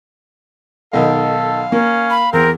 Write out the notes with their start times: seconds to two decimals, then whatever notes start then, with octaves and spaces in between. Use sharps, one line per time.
0.93 B1 D#3 A4 F5
1.72 A#3 C#4
2.10 B5
2.33 E2 C4 A#4